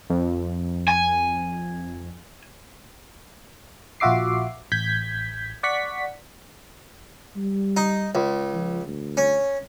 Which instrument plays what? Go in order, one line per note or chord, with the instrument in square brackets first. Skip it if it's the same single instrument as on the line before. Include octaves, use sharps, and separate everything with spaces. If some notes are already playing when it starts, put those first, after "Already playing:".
[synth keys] F2
[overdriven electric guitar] G#5
[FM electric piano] A#1 F4 F#4 E5 D6 C7
A1 G6 G#6 B6
D5 F#5 C#6 B6
[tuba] G3
[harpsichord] D#4
C#2
[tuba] F3
D2
[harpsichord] C#4